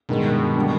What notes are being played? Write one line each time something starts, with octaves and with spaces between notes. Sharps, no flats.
G2 B2 D#3 G#3
D3 G3 A#3 D4